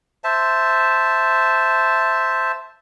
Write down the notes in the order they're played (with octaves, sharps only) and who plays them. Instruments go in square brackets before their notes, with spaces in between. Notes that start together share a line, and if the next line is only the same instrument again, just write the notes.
[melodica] C5 E5 A5